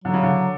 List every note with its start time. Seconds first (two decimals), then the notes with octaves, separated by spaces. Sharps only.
0.04 D3 F#3
0.14 C#3
0.23 D3